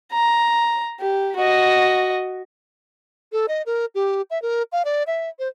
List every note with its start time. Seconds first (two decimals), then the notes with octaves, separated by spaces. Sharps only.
0.12 A#5
1.00 G4
1.36 F#4 D#5
3.32 A4
3.48 D#5
3.66 A#4
3.95 G4
4.30 E5
4.42 A#4
4.72 F5
4.85 D5
5.07 E5
5.39 C5